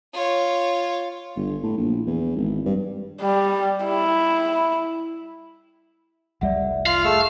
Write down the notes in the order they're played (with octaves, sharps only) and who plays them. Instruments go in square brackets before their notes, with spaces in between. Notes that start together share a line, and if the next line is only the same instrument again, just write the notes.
[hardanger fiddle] F4 C#5
[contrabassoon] G1
A2
A#1
E2
G#1
G2
[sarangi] G3
E4
[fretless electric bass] F1 C2 G3 [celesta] D5 E5 F#5
[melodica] F4 [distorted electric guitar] F5 [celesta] F#7
[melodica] A3 E6 [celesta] G#4